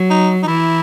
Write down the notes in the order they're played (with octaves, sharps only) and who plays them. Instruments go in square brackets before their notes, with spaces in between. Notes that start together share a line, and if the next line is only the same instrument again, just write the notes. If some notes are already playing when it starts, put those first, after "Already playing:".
Already playing: [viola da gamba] F#3
[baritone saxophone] D#4
D#4
[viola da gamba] E3 [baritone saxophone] E4